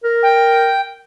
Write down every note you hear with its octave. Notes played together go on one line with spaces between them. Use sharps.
A#4
G5